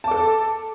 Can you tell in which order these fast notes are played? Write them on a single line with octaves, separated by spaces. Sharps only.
A5 D6 A4